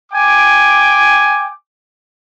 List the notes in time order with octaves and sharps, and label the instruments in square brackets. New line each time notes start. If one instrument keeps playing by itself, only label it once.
[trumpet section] G5 G#5 D6